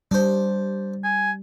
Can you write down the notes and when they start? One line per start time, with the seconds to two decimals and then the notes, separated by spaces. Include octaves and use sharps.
0.11 G3 D4 C5
1.04 G#5